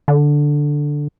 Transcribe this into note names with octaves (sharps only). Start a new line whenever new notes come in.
D3